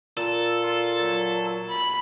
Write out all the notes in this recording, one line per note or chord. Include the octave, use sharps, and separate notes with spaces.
A#2 A4
F4
F#3
B5